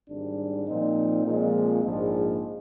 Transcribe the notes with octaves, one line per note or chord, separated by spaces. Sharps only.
G#1 G#2 G3 D4
A#2 F3 C4 D#4
A#2 F3 G#3 C4
A#1 G#2 F3 G#3